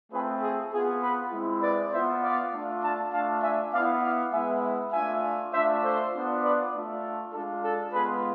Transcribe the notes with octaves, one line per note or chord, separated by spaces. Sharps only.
A3 C4 F4 G#4 B4
G#4
B3 F4 G#4
G#4 B4
G#3 C4 E4
B4 D5
B3 F4 C5 E5
D5 F5
A3 D4 F4
F5 A5
A3 D4 F4 F5 A5
E5 G#5
B3 E4 D5 F5
D5 F5
G#3 B3 E4 E5 G#5
A3 D4 F4 E5 G#5
A3 D4 F4 C5 E5
A4 C5
B3 D4 F4
B4 D5
A3 D4 F4
G#3 D4 F4 A4
A4
G#3 B3 F4 G#4 B4